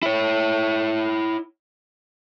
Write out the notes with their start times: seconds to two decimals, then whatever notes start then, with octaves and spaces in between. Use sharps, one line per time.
0.03 E4 C#5